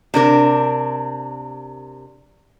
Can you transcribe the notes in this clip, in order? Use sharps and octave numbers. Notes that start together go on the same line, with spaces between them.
C3 D4 A#4